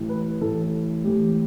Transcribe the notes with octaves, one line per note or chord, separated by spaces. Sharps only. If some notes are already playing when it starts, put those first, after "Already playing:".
Already playing: A1 A2 E3
B4
A1 A2 E3 A4
A1 A2 E3 G4